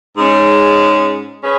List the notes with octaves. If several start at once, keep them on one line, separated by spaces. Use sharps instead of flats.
G#2 G#3 C#4
C#4 G#4 B4